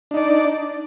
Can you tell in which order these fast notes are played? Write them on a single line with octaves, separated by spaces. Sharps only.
D4 D#4 D5